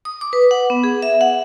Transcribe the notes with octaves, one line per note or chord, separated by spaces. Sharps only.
D#6
D6
B4
F#5
B3
G#4
E5
F#5